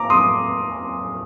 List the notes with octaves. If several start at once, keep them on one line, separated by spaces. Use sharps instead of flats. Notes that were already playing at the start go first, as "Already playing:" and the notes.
Already playing: A#3 A#5 D6
C6 D#6